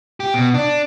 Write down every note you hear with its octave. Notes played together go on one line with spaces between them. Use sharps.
G4
B2
D4